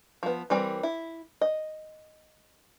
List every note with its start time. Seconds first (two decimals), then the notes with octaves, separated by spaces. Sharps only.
0.23 F3 B3
0.50 E3 G3 C4 A#4
0.83 E4
1.41 D#5